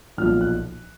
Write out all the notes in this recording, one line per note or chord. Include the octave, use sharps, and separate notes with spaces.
B1 A#2 F3 F6
F#6